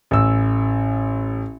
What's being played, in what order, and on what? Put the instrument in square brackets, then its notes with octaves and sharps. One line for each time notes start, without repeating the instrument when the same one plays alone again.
[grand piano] A1 E6